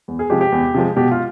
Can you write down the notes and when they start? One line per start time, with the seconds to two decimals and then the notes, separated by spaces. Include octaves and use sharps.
0.08 E2
0.19 G#4
0.30 C3 F3 G#3 G4
0.41 G4
0.52 E2
0.74 C3 F3 G#3
0.97 B2 G4
1.11 F4